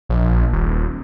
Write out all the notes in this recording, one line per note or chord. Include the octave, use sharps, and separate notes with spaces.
A#1
D#1